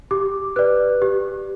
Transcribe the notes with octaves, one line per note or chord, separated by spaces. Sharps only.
G4 D6
B4 D5 F#6
G4